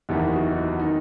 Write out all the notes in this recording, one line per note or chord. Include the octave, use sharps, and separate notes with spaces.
F#1 E2 D#3 E4 G4
D#4 F#4
D#3 D#4